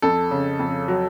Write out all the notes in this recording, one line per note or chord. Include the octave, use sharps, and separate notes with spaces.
F2 A4
C#3
F2
F#3